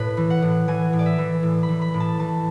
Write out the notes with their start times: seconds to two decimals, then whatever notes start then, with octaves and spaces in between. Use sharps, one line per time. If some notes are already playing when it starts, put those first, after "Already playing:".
Already playing: A2 B4 C#5
0.17 E3
0.30 F#5
0.42 A2
0.68 E3 G#5
0.93 A2
0.99 D5
1.06 E5
1.18 E3
1.43 A2
1.63 B5
1.69 E3
1.82 B5
1.94 A2
2.00 A5
2.19 E3 A5